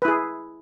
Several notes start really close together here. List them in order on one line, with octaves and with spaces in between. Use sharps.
B4 E4 G#4